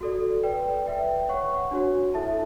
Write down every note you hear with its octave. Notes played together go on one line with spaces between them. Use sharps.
F#4 A4 D5
B4 D5 G5
B4 E5 G5
C#5 F#5 C#6
D4 F#4 C#5
E4 A4 E5 A5